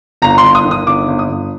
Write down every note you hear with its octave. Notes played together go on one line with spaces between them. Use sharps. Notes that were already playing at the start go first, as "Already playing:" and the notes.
G1 A#5
C6
G1
D#6
D#3
D#6
G1 D6
G1
D#6
G1